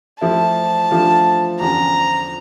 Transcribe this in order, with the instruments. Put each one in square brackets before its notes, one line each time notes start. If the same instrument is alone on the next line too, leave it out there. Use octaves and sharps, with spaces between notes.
[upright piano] F3 A3 E4 [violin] A5
[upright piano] F3 A3 D4 F4
[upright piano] E2 D3 F3 C#4 [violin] A#5